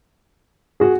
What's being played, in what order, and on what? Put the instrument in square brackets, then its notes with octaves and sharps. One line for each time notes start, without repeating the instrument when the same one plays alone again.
[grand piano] F#4 G#4